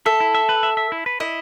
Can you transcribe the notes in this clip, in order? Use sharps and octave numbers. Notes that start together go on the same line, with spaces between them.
A4 E5
E4
E5
B4
E5
E5
E4
B4
E4 D#5